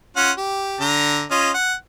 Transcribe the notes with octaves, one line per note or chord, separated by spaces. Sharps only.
C#4 F4 F#5
G4
D3 A#5
C#4 F4 D#5
F#5